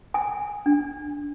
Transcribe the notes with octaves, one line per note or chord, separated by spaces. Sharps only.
G#5
D4